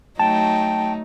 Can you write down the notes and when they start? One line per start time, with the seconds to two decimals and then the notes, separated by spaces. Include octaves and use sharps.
0.20 F#3 A3 D#4 G5 A5